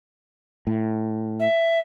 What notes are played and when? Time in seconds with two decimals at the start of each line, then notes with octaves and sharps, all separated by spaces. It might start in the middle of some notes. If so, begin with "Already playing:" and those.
0.67 A2
1.39 E5